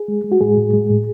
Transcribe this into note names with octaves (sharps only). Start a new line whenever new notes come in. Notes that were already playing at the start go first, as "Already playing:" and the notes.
Already playing: G#4
G#3
G#3
F#4
A2 G#3 G#4
A2
G#3
A2